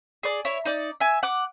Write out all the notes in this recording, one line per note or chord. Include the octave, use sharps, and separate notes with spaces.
G#4 D5
E4 C#5
D#4 D5
E5 G#5
F#5 D6